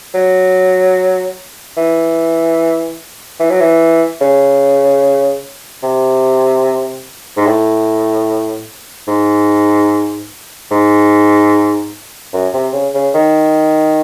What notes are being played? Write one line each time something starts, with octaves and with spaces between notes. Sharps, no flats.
F#3
E3
E3
F#3
E3
C#3
C3
G#2
A2
G#2
G#2
F#2
C3
C#3
C#3
D#3